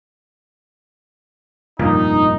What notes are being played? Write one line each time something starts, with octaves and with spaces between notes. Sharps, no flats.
F1 G2 A#2 D#4